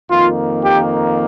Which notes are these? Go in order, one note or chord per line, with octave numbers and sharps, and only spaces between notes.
F2 D#3 A#3 F4
G4